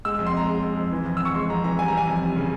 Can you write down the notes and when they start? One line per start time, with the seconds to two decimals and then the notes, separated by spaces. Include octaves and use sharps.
0.05 G#3 E6
0.19 F2
0.26 C6
0.33 G#3 A#5
0.48 G#3
0.63 G#3
0.77 F2
0.92 E3
1.06 F2
1.17 F2 E6
1.25 C#6
1.35 G#3 C6
1.49 F2 A#5
1.64 E3 A#5
1.79 G3 G#5
1.88 A#5
1.93 E3 G#5
2.07 F2
2.22 G3
2.36 C#3